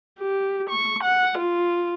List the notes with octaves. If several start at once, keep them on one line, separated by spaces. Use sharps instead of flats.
G4
C#6
F#5
F4